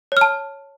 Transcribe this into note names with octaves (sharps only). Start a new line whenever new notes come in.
C#5 A5 F6